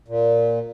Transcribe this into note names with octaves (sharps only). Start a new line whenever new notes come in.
A#2